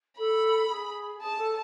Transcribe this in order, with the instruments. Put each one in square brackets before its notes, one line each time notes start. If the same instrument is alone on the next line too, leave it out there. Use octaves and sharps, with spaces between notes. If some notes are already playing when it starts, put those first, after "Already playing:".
[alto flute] A4 [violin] B5
[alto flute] G#4
[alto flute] G#4 [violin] A5
[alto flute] A4